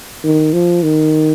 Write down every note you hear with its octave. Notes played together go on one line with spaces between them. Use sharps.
D#3
F3
D#3